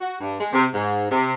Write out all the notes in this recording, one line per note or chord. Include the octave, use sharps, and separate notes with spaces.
F#4
G2
G#3
C3
G#2
C3